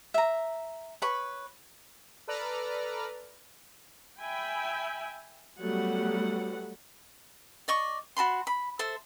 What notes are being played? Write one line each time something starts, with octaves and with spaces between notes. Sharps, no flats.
E5 A#5
B4 C#5 B5 C#6
A4 B4 D5 A#5 F6
E5 G5 G#5 B5
F#3 G3 A3 B3 F#5
D5 D#5 C#6
F#4 A5 B5 C6
B5
A4 C5 E5